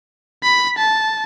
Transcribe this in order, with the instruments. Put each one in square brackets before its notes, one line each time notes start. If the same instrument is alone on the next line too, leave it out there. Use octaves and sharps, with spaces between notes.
[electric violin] B5
A5